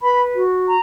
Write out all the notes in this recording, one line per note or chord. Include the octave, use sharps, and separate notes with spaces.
B4 B5
F#4
A#5